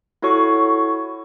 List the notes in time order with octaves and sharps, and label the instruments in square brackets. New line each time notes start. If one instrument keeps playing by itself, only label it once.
[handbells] E4 F#4 A4 C#5 C#6